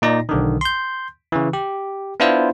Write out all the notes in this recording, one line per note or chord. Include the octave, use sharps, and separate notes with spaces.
A#2 D#4 D5 A#6
B1 D3 D#3
C6 G6
C#3 E3
G4
B3 D4 E4 F4 C5